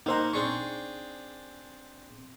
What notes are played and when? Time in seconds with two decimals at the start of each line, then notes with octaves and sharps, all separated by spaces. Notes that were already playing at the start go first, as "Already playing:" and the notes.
0.06 A#3 D#4 C5 F#5 A#5
0.34 C4 D4 G#4 C#6